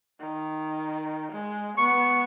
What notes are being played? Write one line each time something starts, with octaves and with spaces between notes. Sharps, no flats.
D#3
G#3
B3 C#6